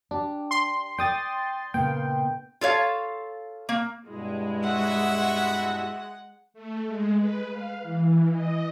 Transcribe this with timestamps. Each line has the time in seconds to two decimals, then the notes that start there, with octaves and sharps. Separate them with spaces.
0.11 D4 G4
0.51 C6
0.98 D5 G5 D#6 A6
1.74 A#2 C#3 B3 G5
2.61 F4 A4 C#5 F5
3.69 A#3
4.08 G2 B2 G#3 E4
4.63 F#4 E5 F#5
6.54 A3
6.87 G#3
7.19 B4
7.50 F5
7.83 E3
8.31 D#5